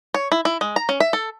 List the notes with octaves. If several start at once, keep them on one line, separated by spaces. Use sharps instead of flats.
C#5
E4
E4
G#3
A#5
C#4
E5
A4